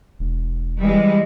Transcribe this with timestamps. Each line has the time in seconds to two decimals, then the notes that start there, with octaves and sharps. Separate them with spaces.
0.19 E1
0.80 E3 G3 G#3